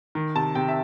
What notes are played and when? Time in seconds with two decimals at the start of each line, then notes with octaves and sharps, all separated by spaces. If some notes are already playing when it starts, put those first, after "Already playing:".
0.15 D#3
0.35 C3 A5
0.55 C3 G5
0.68 E5